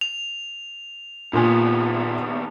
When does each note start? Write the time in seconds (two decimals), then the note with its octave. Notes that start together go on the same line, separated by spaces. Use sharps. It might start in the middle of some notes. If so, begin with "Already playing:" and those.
0.01 F7
1.33 D#2 A#2 B3 F4 G#5